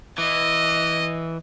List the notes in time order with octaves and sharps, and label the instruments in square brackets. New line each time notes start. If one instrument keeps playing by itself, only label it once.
[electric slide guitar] E3 [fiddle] D#5